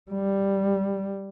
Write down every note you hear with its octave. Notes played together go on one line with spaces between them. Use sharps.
G3